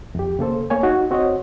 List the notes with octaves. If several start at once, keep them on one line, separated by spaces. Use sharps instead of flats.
F2 G4
C#3 A#3 A4 C5
A#3 C#5 G#5
D#4 F#4
C4 F#4 C5 C#5 D#5